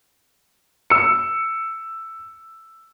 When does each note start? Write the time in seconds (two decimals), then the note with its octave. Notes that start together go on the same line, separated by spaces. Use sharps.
0.90 E6 C#7